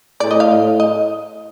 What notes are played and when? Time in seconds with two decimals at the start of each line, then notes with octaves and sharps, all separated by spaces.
0.20 A2 D5
0.31 D#5
0.40 F5
0.50 A2
0.80 D#5